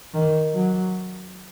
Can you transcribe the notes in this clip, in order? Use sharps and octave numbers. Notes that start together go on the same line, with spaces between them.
D#3
F#3